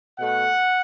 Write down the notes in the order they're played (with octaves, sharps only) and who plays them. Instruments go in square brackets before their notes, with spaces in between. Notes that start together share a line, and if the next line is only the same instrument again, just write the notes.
[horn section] B2 A3 F#5